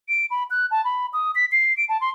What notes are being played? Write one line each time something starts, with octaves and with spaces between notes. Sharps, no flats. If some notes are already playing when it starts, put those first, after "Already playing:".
D7
B5
F#6
A5
B5
D#6
B6
C7
D7
A5
C6